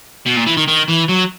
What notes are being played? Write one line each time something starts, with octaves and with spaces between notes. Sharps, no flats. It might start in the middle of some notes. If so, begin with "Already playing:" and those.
B2
A#2
E3
D#3
D#3
E3
F#3